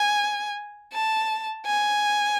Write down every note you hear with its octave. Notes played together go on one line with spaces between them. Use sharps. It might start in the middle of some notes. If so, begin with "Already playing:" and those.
Already playing: G#5
A5
G#5